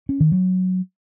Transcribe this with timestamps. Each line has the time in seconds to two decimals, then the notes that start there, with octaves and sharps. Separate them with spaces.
0.09 C#4
0.20 D#3
0.32 F#3